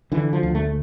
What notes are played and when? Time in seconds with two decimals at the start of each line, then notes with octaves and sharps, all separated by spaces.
0.12 D3 E3
0.33 F3
0.43 D2
0.55 A3